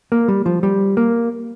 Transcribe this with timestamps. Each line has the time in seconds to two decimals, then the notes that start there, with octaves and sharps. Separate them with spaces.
0.12 A#3
0.28 G3
0.46 F3
0.63 G3
0.97 A#3